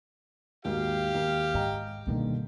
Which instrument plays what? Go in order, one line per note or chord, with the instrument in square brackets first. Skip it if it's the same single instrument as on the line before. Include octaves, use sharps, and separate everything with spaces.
[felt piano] D#2 G#2 F#4 [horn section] G4 F5
[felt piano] D#2
[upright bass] G#2 [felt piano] D#5 G5 A#5
[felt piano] G2 D3 D#3 [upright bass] B2 A#3